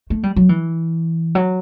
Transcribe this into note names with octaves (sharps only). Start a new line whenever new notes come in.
A3
G3
F#3
E3
F#3